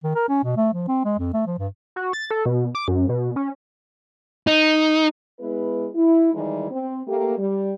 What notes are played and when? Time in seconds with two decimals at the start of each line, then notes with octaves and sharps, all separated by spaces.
0.04 D#3
0.15 A#4
0.29 C#4
0.44 B2
0.57 A3
0.73 F3
0.88 C4
1.05 G#3
1.19 F2
1.34 A3
1.46 F3
1.59 G2
1.96 F#4
2.13 A6
2.31 A4
2.46 B2
2.75 D6
2.88 F#2
3.09 B2
3.36 C#4
4.47 D#4
5.40 G#3 B3 E4 B4
5.95 E4
6.34 D#3 E3 G3 G#3 D#4 E4
6.71 C4
7.07 A3 A#3 G4
7.38 G3